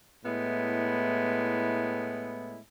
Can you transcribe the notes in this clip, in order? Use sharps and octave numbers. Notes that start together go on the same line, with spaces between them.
A2 G#3 B3 E4